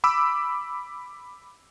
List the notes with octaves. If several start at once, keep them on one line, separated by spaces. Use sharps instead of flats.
B5 D6 E6